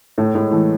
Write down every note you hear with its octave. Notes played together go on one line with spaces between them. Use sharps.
A2 A3
A2 G#3
E3 A3